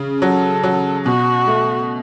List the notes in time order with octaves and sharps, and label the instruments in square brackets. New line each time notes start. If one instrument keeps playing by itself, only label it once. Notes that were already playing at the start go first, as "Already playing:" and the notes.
Already playing: [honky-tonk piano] C#3
[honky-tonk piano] F#3 [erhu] A4
[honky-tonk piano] F#3
[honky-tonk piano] B2 [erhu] F#4
[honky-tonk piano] A3